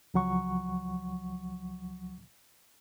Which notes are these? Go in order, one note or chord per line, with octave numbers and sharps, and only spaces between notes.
C#2 F3 F#3 F#5 C#6